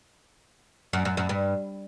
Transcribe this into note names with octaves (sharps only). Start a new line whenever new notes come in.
F#2
F#2
F#2
G2